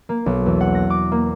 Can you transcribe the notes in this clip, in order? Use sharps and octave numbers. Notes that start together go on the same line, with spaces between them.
A#3
B1
E2
F#5
A#6
D6
A#3